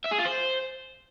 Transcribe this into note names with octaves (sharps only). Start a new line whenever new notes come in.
E5
G#4
F4
C5